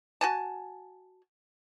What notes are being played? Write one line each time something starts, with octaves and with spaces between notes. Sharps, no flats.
F#4 G#5 A5